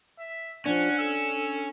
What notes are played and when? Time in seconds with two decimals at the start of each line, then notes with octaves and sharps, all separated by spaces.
0.19 E5
0.66 F3 C#4 D4 F#5
0.98 A4 E6